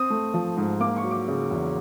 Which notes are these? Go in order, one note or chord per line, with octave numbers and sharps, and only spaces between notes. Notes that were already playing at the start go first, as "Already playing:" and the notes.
Already playing: C4 D#6
A3
F3
G#2
A#3 D6
C#6
F#3
D6
C#3
E2